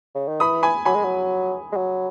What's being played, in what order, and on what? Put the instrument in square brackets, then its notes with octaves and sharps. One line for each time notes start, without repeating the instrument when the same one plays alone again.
[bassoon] C#3
D#3
[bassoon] E3 [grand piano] B5 D#6
[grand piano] G#5 B5
[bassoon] F#3 [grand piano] G#5 B5
[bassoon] G#3
F#3
G#3
F#3